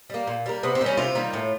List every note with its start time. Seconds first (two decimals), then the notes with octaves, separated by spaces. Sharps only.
0.10 G3 A#3
0.27 A#2
0.46 G3 A#3
0.63 C3 B3
0.75 C4
0.81 D#3 G3 A#3
0.86 C#4
0.97 C3 F4
1.15 D#3 G3 A#3
1.33 A2